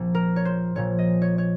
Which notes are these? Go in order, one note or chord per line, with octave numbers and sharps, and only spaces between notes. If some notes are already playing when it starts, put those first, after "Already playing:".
Already playing: A#1 A#2 F3 C4
A#4
C#5
C5
A#1 A#2 F3 C#5
D#5
C#5
C#5